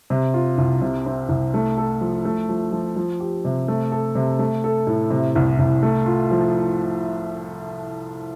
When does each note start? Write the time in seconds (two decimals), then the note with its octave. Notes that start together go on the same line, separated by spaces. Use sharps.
0.10 C3
0.34 F4
0.58 C2
0.82 C3
1.06 C4
1.29 C2
1.54 A3
1.77 A4
2.01 F3
2.25 A3
2.49 F3
2.72 F3
2.96 F3
3.20 G4
3.45 C3
3.68 A3
3.92 A4
4.15 C3
4.39 A3
4.64 A4
4.87 A2
5.10 C3
5.36 C2
5.59 C2
5.83 A3
6.06 F4
6.31 F3